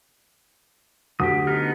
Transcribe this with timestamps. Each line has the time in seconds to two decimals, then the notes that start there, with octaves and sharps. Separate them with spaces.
1.20 D2 G4 D#6
1.47 B3 D#4 F6